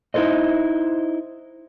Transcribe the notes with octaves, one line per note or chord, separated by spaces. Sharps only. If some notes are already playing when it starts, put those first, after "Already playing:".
D#4 E4 G#4 A4 C5 D#5